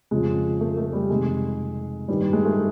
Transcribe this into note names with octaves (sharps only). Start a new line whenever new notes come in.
F2 C#3 F3 G#3
A3
A3
G3
F2 C3 D#3 G#3
G2 D#3 G3
G3
G#3
A3